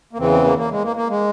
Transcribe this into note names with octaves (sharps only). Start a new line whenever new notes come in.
A#3
E2 C#3 E3 C4
C4
A#3
A#3
G#3
A#3
A#3
G#3